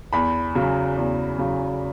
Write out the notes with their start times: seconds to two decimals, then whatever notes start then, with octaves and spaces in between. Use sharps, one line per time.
0.13 E2 B5
0.55 C#3 F#3
0.97 E2
1.38 C#3 F#3